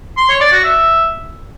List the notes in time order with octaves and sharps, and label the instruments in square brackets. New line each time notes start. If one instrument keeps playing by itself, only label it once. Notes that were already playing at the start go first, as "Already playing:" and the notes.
[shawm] C6
C#5
D5
F#4
E5